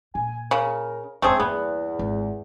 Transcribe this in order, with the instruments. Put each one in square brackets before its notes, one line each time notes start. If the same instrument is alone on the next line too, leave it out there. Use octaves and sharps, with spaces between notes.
[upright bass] A#2 [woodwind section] G#5
[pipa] C#3 [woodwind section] A#4
[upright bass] F1 G#2 [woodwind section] C#3 [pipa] A3 C4 G#4
[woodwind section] E2 [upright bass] G2 A#3 [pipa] B3
[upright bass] G#1